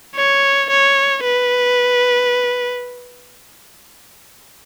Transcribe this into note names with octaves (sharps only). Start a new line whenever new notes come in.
C#5
C#5
B4